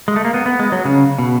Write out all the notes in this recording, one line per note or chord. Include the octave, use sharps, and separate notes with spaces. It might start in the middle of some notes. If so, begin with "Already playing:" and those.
G#3
A3
A#3
B3
B3
G#3
F#3
C#3
B2